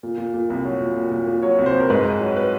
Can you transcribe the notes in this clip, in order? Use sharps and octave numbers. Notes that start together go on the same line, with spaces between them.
A#2
A#2
A#2
C2
F#3
A#2
A#2
A#2
A#2
F#3 C#5
C2
C5
C2
A#4
G#2 B4
G#2
F#3
B4